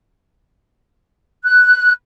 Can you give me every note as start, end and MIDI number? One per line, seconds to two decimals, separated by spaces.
1.45 1.92 90